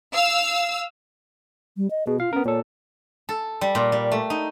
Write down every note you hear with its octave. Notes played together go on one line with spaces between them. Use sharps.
F5 E6
G3
D#5
B2 G#4
F4 F5
B3 C#4 A#4
A#2 A4 C#5
A4
G3
A#2
G3
A3
D#4